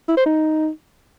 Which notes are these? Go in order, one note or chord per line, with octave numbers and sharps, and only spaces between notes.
E4
C5
D#4